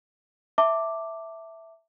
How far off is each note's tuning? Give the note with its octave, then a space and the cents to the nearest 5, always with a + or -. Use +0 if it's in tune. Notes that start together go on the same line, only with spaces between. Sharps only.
E5 +0 A5 +25 D6 +0